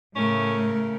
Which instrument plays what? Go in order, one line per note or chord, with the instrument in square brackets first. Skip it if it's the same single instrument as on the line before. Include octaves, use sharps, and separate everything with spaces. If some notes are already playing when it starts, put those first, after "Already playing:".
[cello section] A2 [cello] C#3 A3 [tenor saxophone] C#4 [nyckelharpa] A#4